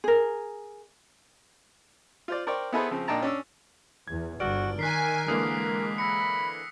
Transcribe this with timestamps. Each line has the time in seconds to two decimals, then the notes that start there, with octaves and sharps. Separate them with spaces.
0.04 G#4 A#4
2.28 F4 C5 D5
2.47 A#4 C5 D5 G5 C#6
2.72 B3 E4 G#4 A4 B4 C5
2.91 C#3 F3 C4
3.08 A#2 D4 D#4 G5 A5 A#5
3.23 C#4 D4 E6
4.08 E2 G#6
4.40 G1 F#4 D5 E6 F6 D7
4.79 D#3 A#4 G#5 F#6 B6 C7
5.28 D3 E3 G#3 A#3 D#6 C7
5.98 B5 E6 A#6 C#7